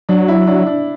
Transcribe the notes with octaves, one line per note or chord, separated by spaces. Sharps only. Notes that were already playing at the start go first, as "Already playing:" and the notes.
F#3 D4
E4
D4
D4